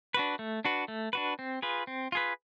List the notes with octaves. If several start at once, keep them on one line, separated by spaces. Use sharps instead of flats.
D4 F#4 B4
A3
D4 F#4 B4
A3
D4 F#4 B4
C4
F4 G#4 B4
C4
F4 G#4 B4